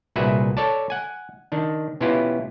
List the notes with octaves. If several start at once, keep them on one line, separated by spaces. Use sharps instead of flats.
C2 A#2 F#4 G#4 B4 E5
A4 C#5 D5 A5
F#5 G#5
D#3 D4
B2 B3 C#4 E4 F4 G4